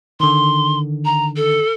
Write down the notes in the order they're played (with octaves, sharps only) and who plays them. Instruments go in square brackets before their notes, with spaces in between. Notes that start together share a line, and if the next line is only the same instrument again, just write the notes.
[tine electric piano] D3 D#3 [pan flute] C6
[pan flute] A#5
A4